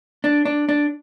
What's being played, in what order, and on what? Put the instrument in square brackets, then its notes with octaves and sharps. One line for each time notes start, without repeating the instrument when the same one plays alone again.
[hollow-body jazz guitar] D4
D4
D4